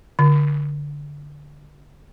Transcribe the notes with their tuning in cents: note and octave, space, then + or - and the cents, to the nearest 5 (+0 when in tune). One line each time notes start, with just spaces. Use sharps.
D3 -10